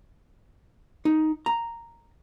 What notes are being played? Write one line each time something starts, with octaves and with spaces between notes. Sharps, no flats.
D#4
A#5